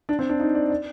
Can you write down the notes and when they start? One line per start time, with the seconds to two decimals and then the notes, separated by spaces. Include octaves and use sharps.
0.09 D4
0.19 C4
0.29 D4
0.40 D#4
0.55 D5
0.70 D5